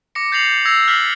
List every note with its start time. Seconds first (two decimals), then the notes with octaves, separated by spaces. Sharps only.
0.15 D6 A#6 C#7
0.32 G6 A6 C7 C#7 F7 F#7
0.65 E6 G#6 A#6 C7 F7
0.88 F6 F#6 A6 B6 F#7